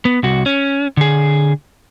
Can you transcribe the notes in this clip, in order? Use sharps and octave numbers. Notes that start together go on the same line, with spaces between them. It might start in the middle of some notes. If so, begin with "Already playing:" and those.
B3
C2 F#4
C#4
D3 G#4